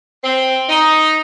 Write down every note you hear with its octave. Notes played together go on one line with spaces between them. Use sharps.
C4
D#4